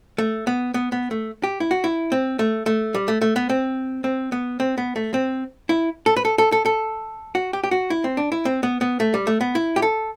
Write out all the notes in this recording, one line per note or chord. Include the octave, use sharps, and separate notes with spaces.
A3
B3
B3
B3
A3
G4
E4
F#4
E4
C4
A3
A3
G3
A3
A3
B3
C4
C4
B3
C4
B3
A3
C4
E4
A4
B4
A4
A4
A4
A4
F#4
G4
G4
F#4
E4
C4
D4
E4
C4
B3
B3
A3
G3
A3
B3
E4
G4
A4